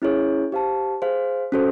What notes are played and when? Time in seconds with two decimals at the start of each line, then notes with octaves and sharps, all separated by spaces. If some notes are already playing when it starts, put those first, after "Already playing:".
0.02 C#4 E4 G#4 C#5
0.52 G4 C5 F5 A5
1.02 G#4 C5 F5
1.52 C#4 F#4 A4 C5